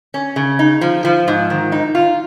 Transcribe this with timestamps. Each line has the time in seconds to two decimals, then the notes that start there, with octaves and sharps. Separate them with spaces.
0.14 C#4
0.36 C#3
0.59 D#4
0.81 F3
1.05 F3
1.28 G#2
1.50 D#3
1.72 D#4
1.95 F4